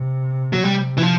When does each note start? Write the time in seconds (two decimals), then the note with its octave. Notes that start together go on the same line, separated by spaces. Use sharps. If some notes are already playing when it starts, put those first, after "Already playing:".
Already playing: C3
0.53 F#3
0.63 C3 G3
0.97 E3
1.03 F3